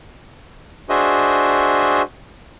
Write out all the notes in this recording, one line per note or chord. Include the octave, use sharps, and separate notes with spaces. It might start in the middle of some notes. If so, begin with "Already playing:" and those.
D4 F#4 G#4 C5 D#5 E5